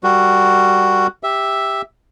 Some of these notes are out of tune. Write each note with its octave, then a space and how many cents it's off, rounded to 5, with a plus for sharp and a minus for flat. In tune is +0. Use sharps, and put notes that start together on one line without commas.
G3 +0 F#4 +0 A#4 -35
G4 +10 E5 +0